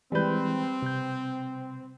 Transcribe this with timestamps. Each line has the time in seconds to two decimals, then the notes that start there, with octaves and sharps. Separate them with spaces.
0.12 E3 G3 G#3 C4 B4 G6
0.82 C3 G6